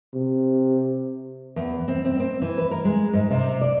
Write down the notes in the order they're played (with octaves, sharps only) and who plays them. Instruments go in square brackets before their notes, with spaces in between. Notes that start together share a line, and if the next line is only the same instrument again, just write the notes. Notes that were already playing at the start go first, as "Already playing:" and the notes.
[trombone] C3
[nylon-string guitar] E2
C4
C4
C4
E3
B4
A#4
G#3
G#2
C3
D5